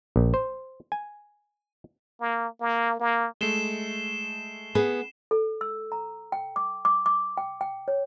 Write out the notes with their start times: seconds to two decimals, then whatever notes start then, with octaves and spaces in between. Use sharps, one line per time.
0.16 A#1
0.34 C5
0.92 G#5
2.21 A#3
2.61 A#3
3.00 A#3
3.41 G#3 A3 C7 E7 G7
4.75 B3 G#4 B4
5.31 A4
5.61 E6
5.92 A#5
6.32 G5
6.56 D6
6.85 D6
7.06 D6
7.37 G5
7.61 G5
7.88 C#5